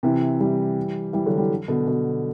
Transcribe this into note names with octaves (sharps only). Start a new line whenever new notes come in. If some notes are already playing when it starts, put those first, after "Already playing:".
C3 E3
E3 G3
E3 G3
D3 F#3
E3 G3
B2 D3
B2